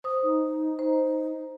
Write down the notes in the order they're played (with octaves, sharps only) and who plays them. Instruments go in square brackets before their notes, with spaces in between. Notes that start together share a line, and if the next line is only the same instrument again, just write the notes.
[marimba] C5 D#6
[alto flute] D#4
[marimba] C5